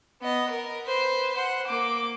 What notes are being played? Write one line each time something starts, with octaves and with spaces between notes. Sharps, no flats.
B3 D#5
A#4
B4 C5
C5 F#5
A#3 D6